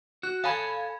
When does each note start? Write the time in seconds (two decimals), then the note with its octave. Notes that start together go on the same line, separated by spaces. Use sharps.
0.23 F#4 F#6
0.44 A4 C#5 F5 G#5 B5 G#6